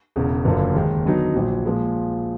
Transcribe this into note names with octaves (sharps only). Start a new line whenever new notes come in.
E1 E2 C#3
F#1 F#2 D3 F3 A#3
D#2 D#3 G#3
D3 F#3 B3 D#4
A#1 A#2 F#3
A#2 F3 G#3